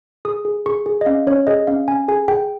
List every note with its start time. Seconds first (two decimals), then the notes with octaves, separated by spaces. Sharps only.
0.25 G#4 D#6
0.45 G#4
0.66 G#4 C#6
0.86 G#4
1.01 D#5
1.06 C#4 F5
1.27 C#4 C#5
1.47 G#4 D#5
1.67 C#4 F5
1.88 C#4 G#5
2.08 G#4 G#5
2.28 G#4 G5